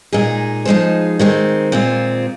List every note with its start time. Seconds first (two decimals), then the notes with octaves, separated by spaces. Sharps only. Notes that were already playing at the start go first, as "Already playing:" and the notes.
0.13 A#2 G#3 D#4 G#4
0.65 F3 G#3 D#4 G#4 C5
1.19 D#3 G#3 C4
1.72 A#2 G#3 C4 F4